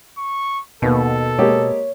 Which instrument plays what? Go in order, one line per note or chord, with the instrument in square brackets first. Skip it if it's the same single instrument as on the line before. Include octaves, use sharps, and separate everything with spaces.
[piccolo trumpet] C#6
[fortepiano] D#2 B3 [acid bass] B2 [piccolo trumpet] A4
[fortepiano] G#3 A#3 G4 [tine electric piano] C#5